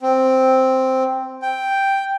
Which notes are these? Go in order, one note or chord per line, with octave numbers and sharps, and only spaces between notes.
C4
G5